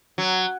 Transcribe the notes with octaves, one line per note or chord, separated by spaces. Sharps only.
F#3